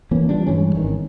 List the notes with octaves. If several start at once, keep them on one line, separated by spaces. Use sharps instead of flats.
E3 A#3 B3 C#4
F3 G3 D4
G2 E3 G#3 C#4
G#1 D#3